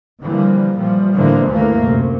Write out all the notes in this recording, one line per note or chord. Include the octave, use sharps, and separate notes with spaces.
D3 E3 F3 G3 A#3
A#2 E3 F3 G3
A2 D3 E3 F3 G#3 A#3
D2 G2 E3 A3 A#3
F#2 C3